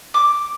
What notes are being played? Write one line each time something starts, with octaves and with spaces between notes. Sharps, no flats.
D6